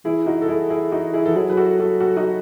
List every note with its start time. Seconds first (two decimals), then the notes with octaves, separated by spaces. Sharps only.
0.05 E3 E4 G#4
0.26 D#4 F#4
0.42 A4
0.48 E4 G#4
0.70 E4 G#4
0.92 D#4 F#4
1.13 E4 G#4
1.25 E3 A4
1.36 F#3 E4 G#4
1.49 B4
1.57 F#4 A4
1.79 F#4 A4
2.00 F#4 A4
2.17 D#4 F#4